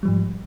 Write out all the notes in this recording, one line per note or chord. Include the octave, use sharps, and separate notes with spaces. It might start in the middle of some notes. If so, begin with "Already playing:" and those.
G#2 F3 G3